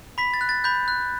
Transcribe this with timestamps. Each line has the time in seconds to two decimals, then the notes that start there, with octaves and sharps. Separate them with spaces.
0.18 B5 B6
0.34 A6
0.41 F#6
0.49 A6
0.64 B5 G6
0.88 F#6